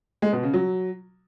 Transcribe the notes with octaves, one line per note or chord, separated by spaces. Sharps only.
G#3
B2
C#3
F#3